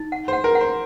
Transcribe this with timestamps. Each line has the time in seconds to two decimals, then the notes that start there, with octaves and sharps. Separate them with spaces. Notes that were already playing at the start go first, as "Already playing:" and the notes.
Already playing: D#4
0.12 F#5
0.28 C5 F#5
0.44 A#4
0.55 F#5
0.61 C5